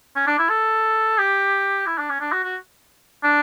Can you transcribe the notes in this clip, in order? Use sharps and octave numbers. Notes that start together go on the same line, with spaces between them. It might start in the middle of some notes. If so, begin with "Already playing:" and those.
C#4
D4
E4
A4
G4
E4
D4
C#4
D4
F#4
F#4
D4